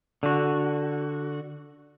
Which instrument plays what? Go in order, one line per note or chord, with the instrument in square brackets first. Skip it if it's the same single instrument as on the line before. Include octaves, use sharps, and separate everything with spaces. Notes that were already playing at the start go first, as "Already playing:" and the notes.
[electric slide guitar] D3 F#4